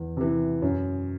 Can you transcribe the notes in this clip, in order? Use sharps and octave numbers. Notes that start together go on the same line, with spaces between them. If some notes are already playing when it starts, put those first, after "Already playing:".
Already playing: E2
C3 E3
F#2